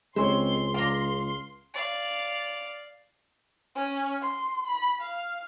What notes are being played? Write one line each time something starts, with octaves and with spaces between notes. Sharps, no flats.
C#2 G#3 C4 C5 C#5 C6
D5 F5 A#5
D5 F5
C#4
C6
B5
F5